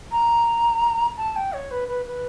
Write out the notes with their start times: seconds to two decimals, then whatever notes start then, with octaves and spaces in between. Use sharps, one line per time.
0.12 A#5
1.17 A5
1.36 G5
1.53 C#5
1.71 B4
1.88 B4
2.06 B4